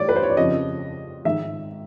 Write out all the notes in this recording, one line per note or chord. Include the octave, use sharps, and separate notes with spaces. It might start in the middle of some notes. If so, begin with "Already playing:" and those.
Already playing: A2 E3 G3 C#5 D5
B4
C5
C#5
D5
F2 C#3 F3 D#5
G#2 D#3 G#3 E5